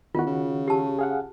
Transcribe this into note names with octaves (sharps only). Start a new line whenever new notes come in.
E2 D#3 F4 F#4
C#3
G4 A5
G#4 F5 F#5